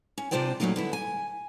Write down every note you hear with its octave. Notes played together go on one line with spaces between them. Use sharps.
C#4
C3 D4 F4 C5 D5 G5
G2 A#2 F#3 A3 A#3 D#4
D3 B3 E4
G#5